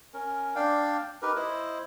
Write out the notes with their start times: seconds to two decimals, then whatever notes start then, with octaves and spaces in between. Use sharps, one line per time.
0.14 C#4 A#4
0.56 D4 D5 F5 G5
1.22 D#4 G4 A#4 B4
1.36 E4 C5 D#5